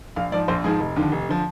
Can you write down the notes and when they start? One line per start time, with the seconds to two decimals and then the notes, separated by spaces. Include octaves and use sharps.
0.16 A#1 F5
0.32 G#2 F3 D5
0.48 A#1 C5
0.64 G#2 F3 G#4
0.80 F1
0.96 D#2 D3 F3
1.12 F1
1.29 D3 F3